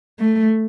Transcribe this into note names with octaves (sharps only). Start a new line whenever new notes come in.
A3